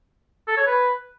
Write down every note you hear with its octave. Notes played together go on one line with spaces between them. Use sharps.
A4
C#5
B4